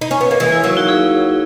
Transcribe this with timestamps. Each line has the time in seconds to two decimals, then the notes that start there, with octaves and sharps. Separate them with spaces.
0.01 D#4
0.11 C#4
0.21 B3
0.31 A#3
0.40 E3 G#3
0.52 E4
0.64 F#3 A#3 E4
0.77 D#4 F#4
0.89 E4 G#4